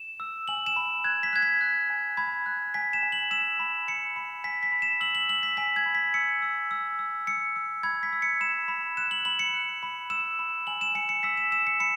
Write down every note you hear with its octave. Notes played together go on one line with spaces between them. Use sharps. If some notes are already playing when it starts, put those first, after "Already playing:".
Already playing: E7
E6
G#5 F#7
E7
B5
F#6 G#6
B6
F#6 G#6
B6
F#6
G#5
B5 G#6
F#6
G#5 B6
E7
G#5
F#7
E6 E7
B5
B5 C#7
B5
G#5 B6
B6
B5
E7
E6 F#7
F#7
E6 F#7
B6
G#5 B6
G#6
B5
B6
E6 C#7
E6
E6
E6
E6 C#7
E6
B5 G#6
B6
E6
C#7
B5 E7
B5
F#6 E7
F#7
B5 F#7
C#7
F#6
B5
E6 E7
B5
G#5 F#7
E7
G#5 C#7
C#7
E6 B6
E7
E6 E7
C#7
B5 C#7